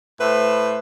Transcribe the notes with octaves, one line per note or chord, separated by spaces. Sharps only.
A2 B4 C5 E5